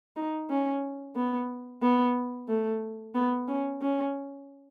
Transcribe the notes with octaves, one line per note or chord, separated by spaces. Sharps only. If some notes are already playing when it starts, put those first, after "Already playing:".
D#4
C#4
B3
B3
A3
B3
C#4
C#4